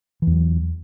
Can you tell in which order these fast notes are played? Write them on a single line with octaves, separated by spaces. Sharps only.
E3 E2 F#3